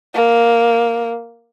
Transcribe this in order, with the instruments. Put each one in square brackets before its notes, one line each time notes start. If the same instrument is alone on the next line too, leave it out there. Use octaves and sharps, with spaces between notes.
[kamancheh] A#3